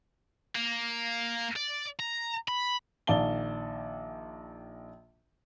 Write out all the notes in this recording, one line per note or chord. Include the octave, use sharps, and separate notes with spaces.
A#3
D5
A#5
B5
A#1 D#3 D5 F5 A5 G7